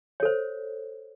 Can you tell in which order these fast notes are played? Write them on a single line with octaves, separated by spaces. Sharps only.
C#5 A4 C5